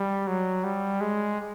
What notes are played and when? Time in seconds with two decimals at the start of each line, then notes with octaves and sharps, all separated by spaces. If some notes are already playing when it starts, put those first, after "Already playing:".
Already playing: G3
0.27 F#3
0.64 G3
1.01 G#3